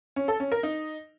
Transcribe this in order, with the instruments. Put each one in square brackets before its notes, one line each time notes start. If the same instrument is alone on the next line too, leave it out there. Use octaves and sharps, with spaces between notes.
[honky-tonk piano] C#4
A4
C#4
A#4
D#4